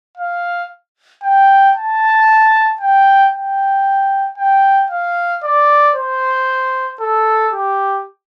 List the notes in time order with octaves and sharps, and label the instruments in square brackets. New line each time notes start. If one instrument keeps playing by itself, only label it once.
[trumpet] F5
G5
A5
G5
G5
G5
F5
D5
C5
A4
G4